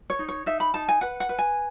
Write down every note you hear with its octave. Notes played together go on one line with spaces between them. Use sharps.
C#5
D#4
C#5
D#4 E5
B5
D#4 A5
G#5
B4 F#5
F#5
B4
G#5